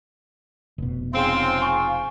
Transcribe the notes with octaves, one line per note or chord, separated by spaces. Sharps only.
F1 B2
G#2 C#3 C4 F4
G#5 C#6